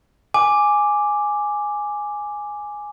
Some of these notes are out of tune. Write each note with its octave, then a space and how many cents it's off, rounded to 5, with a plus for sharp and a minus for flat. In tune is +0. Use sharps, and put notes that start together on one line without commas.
G#5 +0 D6 +0